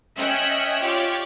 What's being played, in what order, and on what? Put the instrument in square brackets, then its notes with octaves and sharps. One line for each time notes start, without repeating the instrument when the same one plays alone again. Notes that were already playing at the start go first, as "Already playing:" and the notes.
[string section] C#4 D#5 E5 G5 F#6
F4 G4 C#5 D5